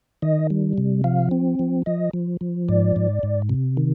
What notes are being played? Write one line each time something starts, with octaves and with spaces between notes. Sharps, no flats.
D#3 D#5
G3
C3
F3 F5
C4
F3
F3 D#5
F3
F3
G#2 D5
G#2
G#2
C3
D#3